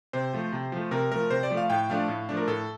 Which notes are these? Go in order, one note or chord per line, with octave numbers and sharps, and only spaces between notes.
C3 C5
F3 A3
C3
F3 A3
C3 A#4
F3 A3 A#4
C3 C5
D5
F3 A3
F5
A2 G5
F3 A3 D4 F5
A2
F3 A3 D4
A#4
A2 A4